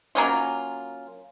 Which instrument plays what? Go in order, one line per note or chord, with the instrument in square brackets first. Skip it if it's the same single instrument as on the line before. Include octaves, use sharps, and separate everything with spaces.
[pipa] F#3 A#3 C#4 F4